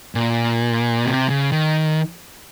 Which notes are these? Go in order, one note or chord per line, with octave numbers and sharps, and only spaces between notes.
A#2
C3
C#3
D#3